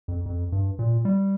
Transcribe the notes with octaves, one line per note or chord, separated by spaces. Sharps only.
F2
F2
G2
A#2
G3